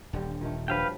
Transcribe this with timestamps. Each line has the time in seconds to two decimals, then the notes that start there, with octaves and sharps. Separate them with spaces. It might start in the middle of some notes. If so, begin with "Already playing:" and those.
0.13 D#1 G2 D3 G3
0.41 A#2 D#3 A3
0.68 G2 F3 F#3 B4 F5 G5